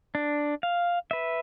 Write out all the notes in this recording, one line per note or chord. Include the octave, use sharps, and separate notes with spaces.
D4
F5
B4 E5